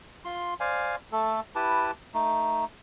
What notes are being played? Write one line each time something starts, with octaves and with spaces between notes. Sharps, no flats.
F4 C6
C5 D5 F5 G#5
A3 A4
E4 G4 B4 A5
A3 D#4